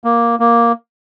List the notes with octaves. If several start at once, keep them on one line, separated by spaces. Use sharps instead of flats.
A#3
A#3